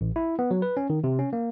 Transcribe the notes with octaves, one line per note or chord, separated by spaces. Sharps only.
A1
E4
B3
F#3
B4
C#4
D#3
C3
C#4
A#3